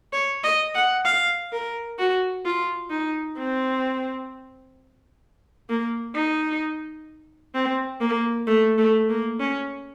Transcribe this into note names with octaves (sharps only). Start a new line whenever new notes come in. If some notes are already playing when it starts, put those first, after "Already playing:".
C#5
D#5
F#5
F5
A#4
F#4
F4
D#4
C4
A#3
D#4
C4
A#3
A3
A3
A#3
C#4